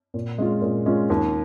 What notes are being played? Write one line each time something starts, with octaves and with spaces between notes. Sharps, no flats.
A#2
G#3 C#4 F4
A#2
G#3 C#4 F4
D#2